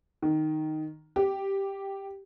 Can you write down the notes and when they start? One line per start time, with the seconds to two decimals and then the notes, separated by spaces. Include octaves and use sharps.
0.22 D#3
1.16 G4